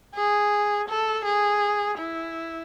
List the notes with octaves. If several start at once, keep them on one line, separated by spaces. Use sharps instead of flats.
G#4
A4
G#4
E4